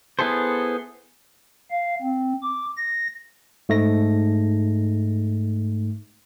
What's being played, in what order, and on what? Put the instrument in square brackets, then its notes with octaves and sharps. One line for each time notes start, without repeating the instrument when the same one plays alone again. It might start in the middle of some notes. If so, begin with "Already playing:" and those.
[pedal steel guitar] B3 E4 G#4 A4 C5
[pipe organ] F5
C4
D6
A#6
[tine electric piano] G#2 A3 D#4 A#6